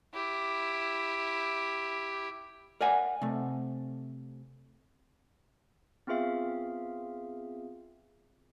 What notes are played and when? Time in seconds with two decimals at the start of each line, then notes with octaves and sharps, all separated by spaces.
0.14 E4 G4
2.81 A#4 D5 F#5 G#5
3.22 C3 A3
6.07 B3 C4 F4 G#4 E5 F5